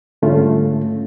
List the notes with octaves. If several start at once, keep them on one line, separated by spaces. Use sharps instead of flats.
G#2 D3 G3 A3 C#4 F4